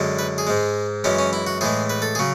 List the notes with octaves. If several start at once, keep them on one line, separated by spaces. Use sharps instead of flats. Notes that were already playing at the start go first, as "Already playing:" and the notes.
Already playing: F#2 D3 G#3
B4
G#4
G#2 G#3
F#2 E3 G#3 C#4
C#4
E4
F#4
A2 E3 G#3 G#4
B4
A4
C#3 F#3 G#4